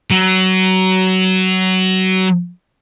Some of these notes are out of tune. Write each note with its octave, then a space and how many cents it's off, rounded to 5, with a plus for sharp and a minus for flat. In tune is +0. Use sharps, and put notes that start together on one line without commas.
F#3 +20